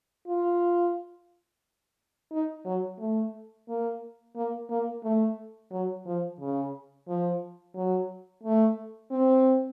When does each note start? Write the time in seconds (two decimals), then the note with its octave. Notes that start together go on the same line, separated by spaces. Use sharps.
0.27 F4
2.32 D#4
2.65 F#3
3.00 A3
3.68 A#3
4.36 A#3
4.70 A#3
5.04 A3
5.72 F#3
6.06 F3
6.40 C#3
7.08 F3
7.75 F#3
8.43 A3
9.11 C4